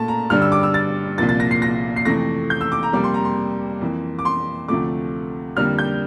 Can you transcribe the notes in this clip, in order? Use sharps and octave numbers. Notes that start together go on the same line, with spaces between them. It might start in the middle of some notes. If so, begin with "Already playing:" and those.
Already playing: A#2 A3 A5
A#5
G2 D3 G3 F6
E6
D6
E6
A6
C2 A#2 F3 A#3 A6
A6
A#6
C7
A#6
C7
F2 C3 E3 A3 A#6
G6
E6
D6
A#5
F2 C3 G3 A#3 D6
C6
A#5
C6
F2 E3 A#3
D6
C6
D2 C3 F3 A3 D6
F2 D3 G3 A#3 F6
G6